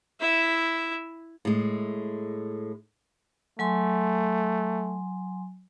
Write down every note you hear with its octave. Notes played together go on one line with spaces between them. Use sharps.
E4 E5
A2 G#3
F#3 A3 G#5 C6